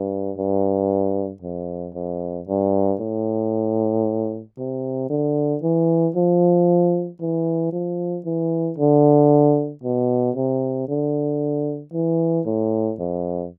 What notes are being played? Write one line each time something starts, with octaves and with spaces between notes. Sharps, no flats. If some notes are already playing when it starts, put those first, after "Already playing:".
Already playing: G2
G2
F2
F2
G2
A2
C3
D3
E3
F3
E3
F3
E3
D3
B2
C3
D3
E3
A2
F2